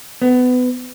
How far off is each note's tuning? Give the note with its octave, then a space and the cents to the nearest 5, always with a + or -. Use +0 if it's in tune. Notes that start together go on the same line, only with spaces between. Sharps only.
B3 +25